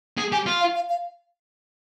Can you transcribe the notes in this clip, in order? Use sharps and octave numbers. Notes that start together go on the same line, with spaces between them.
G#4
G4 G#5
F4
F5
F5
F5